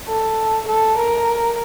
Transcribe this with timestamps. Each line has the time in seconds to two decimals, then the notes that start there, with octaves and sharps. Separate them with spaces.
0.09 A4
0.68 A4
0.97 A#4